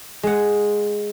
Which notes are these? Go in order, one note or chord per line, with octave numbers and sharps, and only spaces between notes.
G#3 F#5